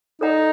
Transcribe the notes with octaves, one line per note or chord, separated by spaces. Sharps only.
D#4 A4 D5 F#5 A#5